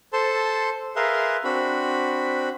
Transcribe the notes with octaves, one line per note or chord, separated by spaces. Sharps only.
A4 C5 A5 C6
G#4 A#4 B4 E5 F5 C6
C4 D4 F#4 B5